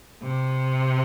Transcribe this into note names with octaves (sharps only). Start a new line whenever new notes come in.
C3